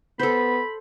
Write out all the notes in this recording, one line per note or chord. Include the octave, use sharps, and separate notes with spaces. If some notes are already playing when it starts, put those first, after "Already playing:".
B3 A4 C5 B5